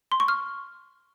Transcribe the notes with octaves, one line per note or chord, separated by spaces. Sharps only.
C6
C#6
F6